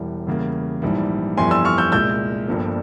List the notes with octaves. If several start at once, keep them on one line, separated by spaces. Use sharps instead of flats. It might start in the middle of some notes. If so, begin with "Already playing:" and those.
Already playing: E1 E2 E3 G3
E2 C#3 G3 A#3
A#1 G#2 E3 G3
G1 F2 E3 G3 G#5 C6
C6 E6
C#6 F6
E6 G6
C2 A#2 G#3 E6 G6
G1 G2 F3 A#3